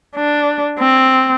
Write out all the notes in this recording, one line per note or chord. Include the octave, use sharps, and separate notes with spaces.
D4
C4